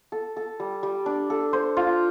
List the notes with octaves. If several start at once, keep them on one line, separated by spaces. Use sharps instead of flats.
A4
A4
G3
G3
D4
A4
C5
F4